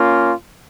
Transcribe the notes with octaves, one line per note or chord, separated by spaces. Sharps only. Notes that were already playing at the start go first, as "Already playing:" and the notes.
Already playing: A#3 C#4 F4